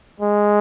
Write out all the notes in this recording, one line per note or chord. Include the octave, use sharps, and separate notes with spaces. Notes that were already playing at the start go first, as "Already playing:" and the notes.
G#3